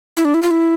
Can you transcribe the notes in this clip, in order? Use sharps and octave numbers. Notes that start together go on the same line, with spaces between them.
E4
D4
E4
F4
E4